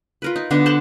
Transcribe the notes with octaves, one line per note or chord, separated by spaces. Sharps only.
F4 A#4 B4
D#4
D3 B3 D4
C5 F#5 A5 C6